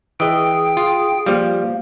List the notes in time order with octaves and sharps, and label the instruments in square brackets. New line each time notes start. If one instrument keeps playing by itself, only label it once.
[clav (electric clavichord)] E3 D#5 [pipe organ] G#4 G5
[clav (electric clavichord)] F4
[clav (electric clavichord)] F3 G3 [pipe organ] A#3